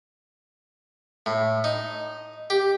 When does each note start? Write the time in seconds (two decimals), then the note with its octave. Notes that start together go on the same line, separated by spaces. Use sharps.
1.26 A2
1.64 D#4
2.50 G4